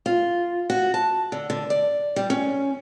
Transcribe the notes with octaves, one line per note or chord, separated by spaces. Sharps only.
F4
F#4
A5
D3
D3
D5
G3
C#4